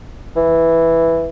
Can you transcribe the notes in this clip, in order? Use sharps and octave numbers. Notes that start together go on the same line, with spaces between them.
E3